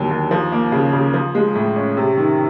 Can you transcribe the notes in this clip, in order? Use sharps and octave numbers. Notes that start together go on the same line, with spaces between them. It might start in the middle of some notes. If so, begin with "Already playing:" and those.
Already playing: D#2 D3 F#3
D#2
F3
A#3
C#3
C#3
F3
G#3
A2
C#4
C3
D#3